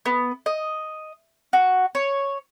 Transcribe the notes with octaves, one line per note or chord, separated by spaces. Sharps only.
B3
D#5
F#4
C#5